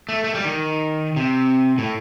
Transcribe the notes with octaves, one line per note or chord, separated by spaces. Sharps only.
A3
A3
G3
D#3
C3
A2